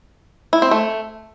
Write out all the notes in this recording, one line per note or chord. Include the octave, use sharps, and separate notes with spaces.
E4
C4
A3